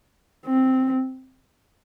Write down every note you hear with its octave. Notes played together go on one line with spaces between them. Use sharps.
C4